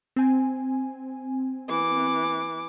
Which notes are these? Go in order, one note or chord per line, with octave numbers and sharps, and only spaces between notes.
C4 G#5
E3 D6